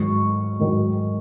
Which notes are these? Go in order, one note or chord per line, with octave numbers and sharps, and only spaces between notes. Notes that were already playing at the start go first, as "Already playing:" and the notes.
Already playing: G#2 D#3 F#3 C#6
G#2 D#3 F#3